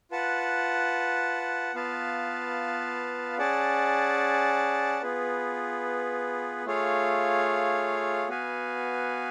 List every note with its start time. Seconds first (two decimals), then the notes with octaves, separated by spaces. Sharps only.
0.11 F4 B4 F#5 A5
1.75 B3 F4 B4 F5 A5
3.38 C#4 G#4 D5 F#5 A5
5.02 B3 F4 G#4 B4
6.65 A3 F4 G#4 C#5 F5
8.28 B3 F#4 B4 F5 G#5